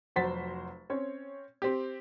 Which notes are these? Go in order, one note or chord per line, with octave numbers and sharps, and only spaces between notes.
F1 F#3 F#4 C5 A6 B6
C4 C#4 C#5
C4 G4